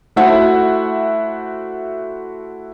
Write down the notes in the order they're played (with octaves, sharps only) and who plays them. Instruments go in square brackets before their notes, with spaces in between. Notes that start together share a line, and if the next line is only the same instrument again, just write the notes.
[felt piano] A3 E4 F#4 C5 E5 F#5